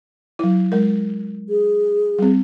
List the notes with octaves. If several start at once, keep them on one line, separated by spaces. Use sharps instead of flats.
F#3 E4
G#3 A#4
G#4
G3 C4